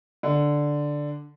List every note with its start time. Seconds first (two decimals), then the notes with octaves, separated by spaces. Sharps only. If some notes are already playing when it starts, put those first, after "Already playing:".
0.23 D3